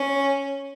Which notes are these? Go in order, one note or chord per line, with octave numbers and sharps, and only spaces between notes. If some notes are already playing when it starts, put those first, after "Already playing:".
Already playing: C#4